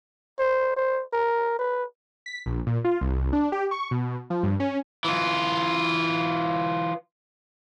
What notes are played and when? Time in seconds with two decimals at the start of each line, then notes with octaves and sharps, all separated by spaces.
0.39 C5
0.77 C5
1.13 A#4
1.59 B4
2.26 B6
2.46 A#1
2.67 A#2
2.84 F4
3.01 C2
3.33 D4
3.52 G4
3.71 C#6
3.91 B2
4.30 F3
4.43 G2
4.60 C#4
5.05 E3 F4